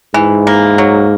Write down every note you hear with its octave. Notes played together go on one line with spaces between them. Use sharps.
G#2 E3
A#3
F#3